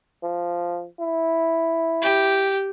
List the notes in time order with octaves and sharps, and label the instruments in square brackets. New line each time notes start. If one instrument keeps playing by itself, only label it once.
[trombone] F3
E4
[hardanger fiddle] G4